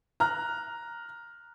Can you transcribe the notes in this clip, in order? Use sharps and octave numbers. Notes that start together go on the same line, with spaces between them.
A#5 F6 F#6